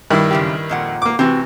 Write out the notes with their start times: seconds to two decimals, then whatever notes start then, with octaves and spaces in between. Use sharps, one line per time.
0.10 G2 D#3 E4
0.31 F#2 C#3 G4
0.69 F2 A#2 F#5
1.02 A#3 D6
1.19 C3 E3 C4 F#4